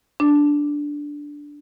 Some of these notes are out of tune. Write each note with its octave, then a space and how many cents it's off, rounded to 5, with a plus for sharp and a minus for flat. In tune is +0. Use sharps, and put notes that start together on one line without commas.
D4 -5